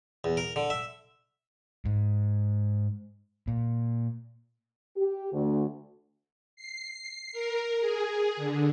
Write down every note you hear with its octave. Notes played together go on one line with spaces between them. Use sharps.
E2
A#4
D3
E5
G#2
A#2
G4
D2
C7
A#4
G#4
D3